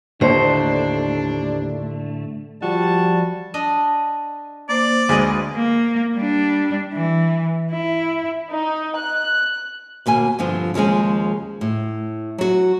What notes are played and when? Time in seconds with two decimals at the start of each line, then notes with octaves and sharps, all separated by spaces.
0.21 D#2 A2 D3 A3 D4 C5
2.62 F3 G3 F#4 A5
3.54 D4 D#5
4.69 A#3 C5 D5
5.09 D2 G#3 B4 D#5 G#5
5.56 A#3
6.16 G3 D4
6.93 E3
7.72 E4
8.53 D#4
8.96 F#6
10.06 D#2 B2 A#3 G#5
10.39 G2 D3 F3 C4 F4
10.74 D#2 C#3 F3 G#3 G#5
11.61 A2
12.38 F#3 F#4